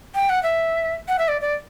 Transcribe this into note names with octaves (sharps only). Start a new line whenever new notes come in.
G5
F#5
E5
F#5
E5
D5
D5